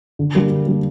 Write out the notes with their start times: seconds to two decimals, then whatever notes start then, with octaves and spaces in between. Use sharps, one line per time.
0.19 D3
0.35 G3 A#3 D4
0.51 D3
0.67 G3 A#3 D4